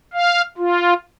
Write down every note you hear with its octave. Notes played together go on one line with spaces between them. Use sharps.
F5
F4